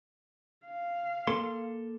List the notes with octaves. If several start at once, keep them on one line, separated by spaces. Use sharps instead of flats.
F5
A#3 A4 C6